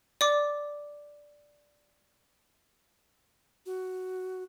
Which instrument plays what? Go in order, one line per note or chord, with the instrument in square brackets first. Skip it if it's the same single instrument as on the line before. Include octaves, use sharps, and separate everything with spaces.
[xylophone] D5 D6
[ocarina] F#4